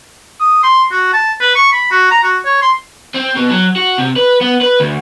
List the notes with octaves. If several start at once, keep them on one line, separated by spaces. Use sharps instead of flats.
D#6
C6
F#4
A5
B4
C#6
B5
F#4
A#5
F#4
C#5
C6
C4
B2
F#3
F#4
C3
B4
B3
B4
D2